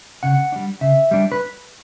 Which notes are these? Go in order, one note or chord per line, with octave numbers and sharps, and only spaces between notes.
C#3 F#5
G3 D4
C#3 E5
G3 D4
B4